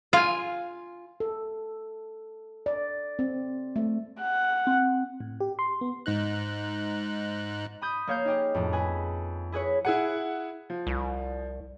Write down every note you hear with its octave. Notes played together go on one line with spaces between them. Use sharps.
F4 F5 G#5
A4
D5
C4
A3
F#5
C4
A2
G4
C6
B3
G#2 D#4 F#6
B5 D#6 G6
A#3 C#5 F5 G6
D#4 G4 G#4
F2 A2
G#4 B4 G#5
E4 G#4 B4 C#5
E4 G#4 F#5
F3
C2